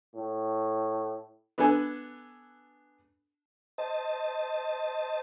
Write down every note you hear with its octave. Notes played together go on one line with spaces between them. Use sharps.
A2
B3 D4 A4 B4 G#5
C5 D#5 A5